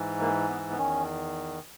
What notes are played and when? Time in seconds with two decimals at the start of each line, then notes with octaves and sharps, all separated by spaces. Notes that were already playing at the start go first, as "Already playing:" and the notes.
Already playing: G#2 E3
0.21 A#3
0.49 B3
0.71 B3
0.78 E2 D#3 C#4